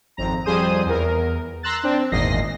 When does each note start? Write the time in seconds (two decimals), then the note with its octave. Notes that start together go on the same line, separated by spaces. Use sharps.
0.17 G#1 F2 A#5
0.45 F2 G3 G#4 C5 D#6 D#7
0.86 E2 A#4
1.63 A#5 C6 E6 F#6 A6
1.83 C4 D4
2.12 G#1 E2 A#2 D#5 A#6 C7